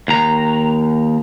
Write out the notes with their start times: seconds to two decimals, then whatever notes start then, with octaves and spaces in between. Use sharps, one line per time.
0.08 D#2 A#5